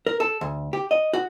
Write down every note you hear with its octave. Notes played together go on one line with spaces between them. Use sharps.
A#4
A4
D2
G4
D#5
F#4